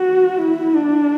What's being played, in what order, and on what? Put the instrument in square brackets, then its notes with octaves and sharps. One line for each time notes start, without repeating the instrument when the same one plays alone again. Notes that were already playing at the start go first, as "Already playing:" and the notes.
Already playing: [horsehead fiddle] F#4
E4
D4